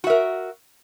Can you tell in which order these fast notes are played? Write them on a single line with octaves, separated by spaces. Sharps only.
F#4 E5 A#4